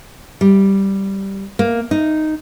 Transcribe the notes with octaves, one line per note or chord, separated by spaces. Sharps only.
G3
A#3
D#4